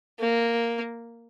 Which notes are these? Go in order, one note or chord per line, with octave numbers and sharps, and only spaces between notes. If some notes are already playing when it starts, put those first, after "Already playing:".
A#3